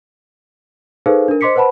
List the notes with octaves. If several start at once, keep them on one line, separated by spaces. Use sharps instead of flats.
D#4 G#4 A4 B4 C5 F5
D4 A#4
C5 D#5 C6 D6 B6 C#7
B4 C5 F#5 A5 B5